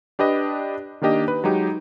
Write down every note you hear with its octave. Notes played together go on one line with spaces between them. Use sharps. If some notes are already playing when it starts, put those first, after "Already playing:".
D4 G4 B4 D#5
D#3 A#3 D4 G4 D#5
B4
F#3 G#3 D#4 G4